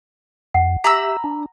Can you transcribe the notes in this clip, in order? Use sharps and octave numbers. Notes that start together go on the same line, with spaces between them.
F2 F#5
G4 E5 A#5 B5 E6
D4